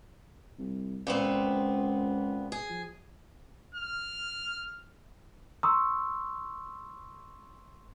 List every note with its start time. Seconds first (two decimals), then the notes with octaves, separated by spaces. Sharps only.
0.58 C2
1.07 C#2 A#2 B3 C4
2.52 G#4
2.70 F3
3.75 F6
5.63 A#5 C6 C#6 D#6 E6